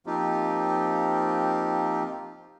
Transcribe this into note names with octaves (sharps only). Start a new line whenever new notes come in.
F3 A#3 C4 D#4 F4 G4